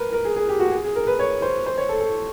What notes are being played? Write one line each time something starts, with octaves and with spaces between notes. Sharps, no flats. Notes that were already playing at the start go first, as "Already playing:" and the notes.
Already playing: A#4 B4
A#4
G#4
G#4
G4
F#4
G#4
G#4
A#4
B4
C#5
C5
C5
C#5
A4
A4